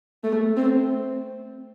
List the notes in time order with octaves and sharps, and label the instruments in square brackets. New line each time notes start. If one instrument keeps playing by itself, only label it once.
[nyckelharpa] A3
C4